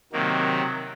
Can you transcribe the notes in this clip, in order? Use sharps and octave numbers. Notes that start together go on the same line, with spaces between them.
C3 D#3 F#3 A#3